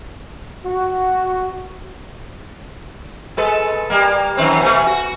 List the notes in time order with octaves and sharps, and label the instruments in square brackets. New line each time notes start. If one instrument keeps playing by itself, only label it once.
[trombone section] F#4
[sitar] G#3 A4 B4
G3 A#3
F#2 D#3 C4
B2 A3
F#4